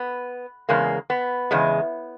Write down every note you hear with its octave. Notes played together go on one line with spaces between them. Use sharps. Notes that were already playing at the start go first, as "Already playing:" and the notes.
Already playing: B3
E2 C#3 G#3 A#3
B3
E2 C#3 G#3